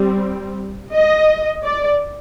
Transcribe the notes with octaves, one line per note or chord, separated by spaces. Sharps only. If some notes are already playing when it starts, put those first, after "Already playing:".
Already playing: G3 C4
D#5
D5